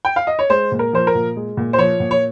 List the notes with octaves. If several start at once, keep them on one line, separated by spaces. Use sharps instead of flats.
G5
F5
D#5
C#5
G#3 C5
A#2
A#4
F3 C5
A#4
A#2
G#3
A#2
C5
F3 C#5
A#2
C#5